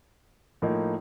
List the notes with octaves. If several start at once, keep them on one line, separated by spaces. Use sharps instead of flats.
A2 F3 A#3 D#4